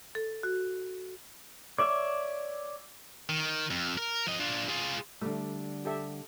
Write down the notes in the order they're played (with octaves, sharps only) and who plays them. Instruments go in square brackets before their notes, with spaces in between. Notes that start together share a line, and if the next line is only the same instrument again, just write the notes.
[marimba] A4
F#4
[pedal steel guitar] C#5 D5 E5 [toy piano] D6
[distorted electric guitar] D#3
F2
A#4
F3 D#5
D4 F4
F4 G#4
[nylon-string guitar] D3 G3 [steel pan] A3
[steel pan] G4 A4 E5